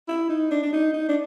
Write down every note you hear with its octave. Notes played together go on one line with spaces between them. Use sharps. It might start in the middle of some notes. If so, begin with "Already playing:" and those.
E4
D#4
D4
D4
D#4
D#4
D4